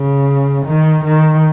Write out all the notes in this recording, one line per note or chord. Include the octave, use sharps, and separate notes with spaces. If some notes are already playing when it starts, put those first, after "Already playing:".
Already playing: C#3
D#3
D#3